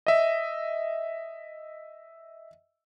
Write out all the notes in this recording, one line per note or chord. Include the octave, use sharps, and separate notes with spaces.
D#5 E5